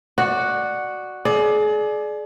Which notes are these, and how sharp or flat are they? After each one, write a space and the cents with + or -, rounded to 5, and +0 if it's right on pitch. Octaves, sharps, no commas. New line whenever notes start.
F#4 +0 D5 +15
G#4 +35 D5 +10